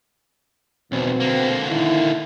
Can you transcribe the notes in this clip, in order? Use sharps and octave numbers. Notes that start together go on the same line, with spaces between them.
B1 E2 B2 C4
D3 A#3
D#3 E4